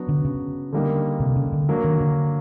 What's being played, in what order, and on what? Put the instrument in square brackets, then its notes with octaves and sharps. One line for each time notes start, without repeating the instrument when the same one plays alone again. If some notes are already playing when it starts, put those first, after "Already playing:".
Already playing: [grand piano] F#3 B3 D4 F#4
[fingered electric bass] D3
C#3
[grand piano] D3 G3 A#3 D#4
[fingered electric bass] C3
C#3
D3
[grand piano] F#3 A#3 D4
[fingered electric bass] D#3
D3